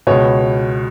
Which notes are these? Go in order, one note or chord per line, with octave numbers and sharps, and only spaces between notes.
C#2 B2 C#5